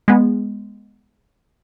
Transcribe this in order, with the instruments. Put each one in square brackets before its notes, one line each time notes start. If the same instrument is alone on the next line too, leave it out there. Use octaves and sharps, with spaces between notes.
[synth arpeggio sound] G#3 B3